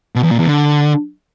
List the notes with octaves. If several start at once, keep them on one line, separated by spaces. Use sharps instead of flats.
B2
E2
A#2
E2
D3